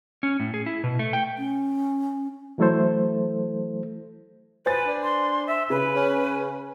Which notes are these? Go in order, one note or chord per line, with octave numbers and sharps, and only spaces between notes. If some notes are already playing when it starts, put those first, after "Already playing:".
C#4
A2
G#4
E4
B2
A3
G5
C#4
E3 F#3 A3 E4 A4 C5
B4 C5 G#5 A6
D4
C6
E5
C#3 B4
C#4